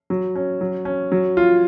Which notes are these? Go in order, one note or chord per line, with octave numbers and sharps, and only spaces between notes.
F#3
C#4
F#3
C#4
F#3
F4